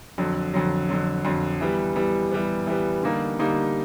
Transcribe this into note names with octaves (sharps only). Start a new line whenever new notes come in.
F2 D3 F#3
F2 D3 F#3
F2 D3 F#3
F2 D3 F#3
E3 G3 B3
E3 G3 B3
E3 G3 B3
E3 G3 B3
D3 G3 A#3 D#4
D3 G3 A#3 D#4